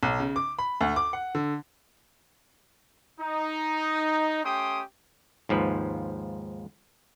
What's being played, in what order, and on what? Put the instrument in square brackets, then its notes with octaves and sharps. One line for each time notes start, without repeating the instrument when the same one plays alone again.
[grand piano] B1
C#3
D6
B5
D2
D6
F#5
D3
[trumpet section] D#4
A3 C#4 G4 G5 C6 D#6
[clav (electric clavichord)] D#2 G#2 F3 B4